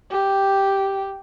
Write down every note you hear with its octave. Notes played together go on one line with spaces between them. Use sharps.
G4